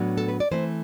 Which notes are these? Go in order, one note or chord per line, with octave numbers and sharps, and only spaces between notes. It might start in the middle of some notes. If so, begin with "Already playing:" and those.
Already playing: A2 F#3 B3 D4
A4
B4
D5
E3 A3 C4 C5